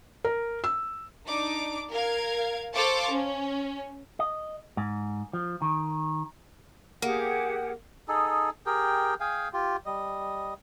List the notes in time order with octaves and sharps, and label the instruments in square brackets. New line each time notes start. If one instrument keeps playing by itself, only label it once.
[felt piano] A#4
E6
[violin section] D4 D#4 D6
A#4 F5 G#6
A4 C5 F5 A5 C#6 D6
C#4
[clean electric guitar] D#5
G#2
F3
D#3
[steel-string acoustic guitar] A#3 [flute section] G4 G#4 F#5
[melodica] D#4 G#4 A4
G4 G#4 A#4 G5
G#4 F5 G5 G#5
F4 G4
G3 D#5